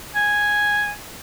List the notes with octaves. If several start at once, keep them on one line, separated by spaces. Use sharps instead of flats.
G#5